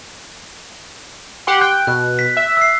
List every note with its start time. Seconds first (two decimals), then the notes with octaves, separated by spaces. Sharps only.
1.47 G4 F#5 C6
1.61 G5 F#6
1.87 B2 F#6
2.19 B6
2.37 E5
2.57 E6 C7